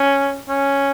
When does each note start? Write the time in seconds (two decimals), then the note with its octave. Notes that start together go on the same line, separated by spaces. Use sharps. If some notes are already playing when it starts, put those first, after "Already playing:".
Already playing: C#4
0.49 C#4